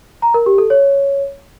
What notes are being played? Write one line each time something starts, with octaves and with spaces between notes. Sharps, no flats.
A#5
A#4
G4
A4
C#5